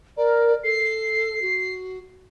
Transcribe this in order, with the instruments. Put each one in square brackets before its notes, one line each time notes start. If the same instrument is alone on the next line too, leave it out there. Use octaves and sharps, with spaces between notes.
[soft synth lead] A#4 [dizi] D5
[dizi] A4 [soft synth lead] C7
[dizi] F#4